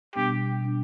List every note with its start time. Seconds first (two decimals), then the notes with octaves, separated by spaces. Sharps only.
0.15 B2 G3 B3 D4 G4
0.61 B2 G3 B3 D4